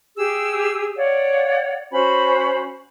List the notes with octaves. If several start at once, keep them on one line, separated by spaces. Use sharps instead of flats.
G4 G#4 E6
C#5 D5 F5 F#5
C#4 F#4 C5 B5